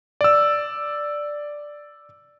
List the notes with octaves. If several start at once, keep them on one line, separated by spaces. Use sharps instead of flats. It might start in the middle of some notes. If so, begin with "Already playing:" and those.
D5 E6